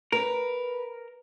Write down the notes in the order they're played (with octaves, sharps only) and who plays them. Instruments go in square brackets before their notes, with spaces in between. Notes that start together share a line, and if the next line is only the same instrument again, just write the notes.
[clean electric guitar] A#4 [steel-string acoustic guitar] B4